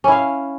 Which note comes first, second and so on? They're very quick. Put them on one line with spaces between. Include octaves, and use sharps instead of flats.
C#4 E4 F5